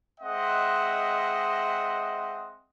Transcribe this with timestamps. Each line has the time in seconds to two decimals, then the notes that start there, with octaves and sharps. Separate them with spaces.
0.21 G#3 C4 D#5 E5 F#5